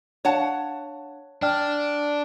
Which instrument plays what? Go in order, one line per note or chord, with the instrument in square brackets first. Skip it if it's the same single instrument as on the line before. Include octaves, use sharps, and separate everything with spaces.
[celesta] D4 F5 [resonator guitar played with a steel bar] C#5 F#5 A5
[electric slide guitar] D4 [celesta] D5 G5 F6